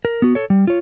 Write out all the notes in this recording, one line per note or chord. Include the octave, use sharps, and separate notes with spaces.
A#4
B3 F#4
A4 C#5
G3
F4 C#5